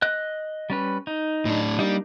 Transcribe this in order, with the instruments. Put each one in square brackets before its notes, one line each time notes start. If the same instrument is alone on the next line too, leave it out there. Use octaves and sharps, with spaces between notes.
[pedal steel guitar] D#5 F#6
G3 C#4 B4
D#4
[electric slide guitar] A2 D4
[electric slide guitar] G3 [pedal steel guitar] A#3 D4 D#4